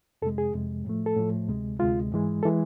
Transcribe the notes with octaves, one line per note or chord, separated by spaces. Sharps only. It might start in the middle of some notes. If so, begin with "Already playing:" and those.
F2 C3 G#3 A4
G#4
F2 C3 G#3
A2 F3 A3
A4
A2 F3 A3
D2 C3 G#3
D2 C3 G#3 F4
G#2 E3 G#3
E3 G#3 A4